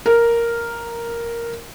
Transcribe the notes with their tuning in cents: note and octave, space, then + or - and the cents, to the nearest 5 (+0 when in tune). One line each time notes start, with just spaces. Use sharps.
A#4 +0